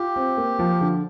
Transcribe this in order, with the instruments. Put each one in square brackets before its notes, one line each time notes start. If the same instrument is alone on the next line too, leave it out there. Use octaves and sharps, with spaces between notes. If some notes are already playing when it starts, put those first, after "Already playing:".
Already playing: [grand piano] F4 [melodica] G4
[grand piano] C4
A#3
F3
D3